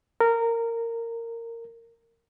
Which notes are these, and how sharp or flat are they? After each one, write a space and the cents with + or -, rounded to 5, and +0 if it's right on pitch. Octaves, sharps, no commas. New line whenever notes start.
A#4 -15